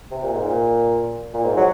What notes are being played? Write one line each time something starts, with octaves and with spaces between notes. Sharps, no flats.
C3
A#2
G#2
A#2
A#2
G#2
F#3